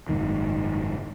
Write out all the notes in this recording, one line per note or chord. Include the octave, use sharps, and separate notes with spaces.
F#1 C2 G#2 D#3